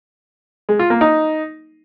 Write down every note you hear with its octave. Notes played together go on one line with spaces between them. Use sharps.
G#3
F4
A#3
D#4